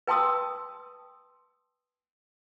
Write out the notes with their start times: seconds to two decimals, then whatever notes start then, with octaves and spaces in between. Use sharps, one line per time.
0.07 B4 G5 A5 C6 D#6 E6